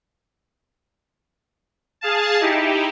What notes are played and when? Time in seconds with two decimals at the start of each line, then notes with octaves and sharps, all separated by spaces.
2.01 G#4 F5 A5
2.41 D#4 E4 G4